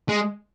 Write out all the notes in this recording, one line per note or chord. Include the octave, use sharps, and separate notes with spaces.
G#3